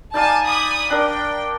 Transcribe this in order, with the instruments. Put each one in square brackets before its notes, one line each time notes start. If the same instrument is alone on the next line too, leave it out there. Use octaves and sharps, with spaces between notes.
[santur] D#4 D5 F5 [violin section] G#5 A5
[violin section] G#5 B5 D#6
[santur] D4 A#4 [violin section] G5